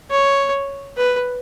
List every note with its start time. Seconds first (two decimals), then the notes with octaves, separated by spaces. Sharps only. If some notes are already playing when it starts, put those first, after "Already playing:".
0.11 C#5
0.97 B4